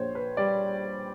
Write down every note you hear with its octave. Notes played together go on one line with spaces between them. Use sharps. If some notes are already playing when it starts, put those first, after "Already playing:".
Already playing: A#1 A#2 C5 C#5
B4
G3 D5